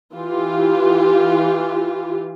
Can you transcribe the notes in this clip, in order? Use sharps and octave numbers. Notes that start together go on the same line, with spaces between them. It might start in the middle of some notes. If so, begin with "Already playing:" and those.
E3 F4 G4